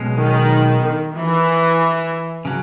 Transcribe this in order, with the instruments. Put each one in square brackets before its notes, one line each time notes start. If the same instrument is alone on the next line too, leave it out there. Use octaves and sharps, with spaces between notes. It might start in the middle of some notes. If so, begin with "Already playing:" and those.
Already playing: [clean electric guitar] B1 B2 G#3 C#4
[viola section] D#3
E3
[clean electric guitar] C#3 F#3